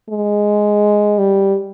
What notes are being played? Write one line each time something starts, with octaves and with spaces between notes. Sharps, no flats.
G#3
G3